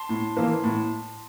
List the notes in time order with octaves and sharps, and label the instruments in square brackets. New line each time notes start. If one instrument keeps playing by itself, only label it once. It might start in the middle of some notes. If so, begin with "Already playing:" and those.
Already playing: [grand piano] A5 C6
A2
E3 A#3
A2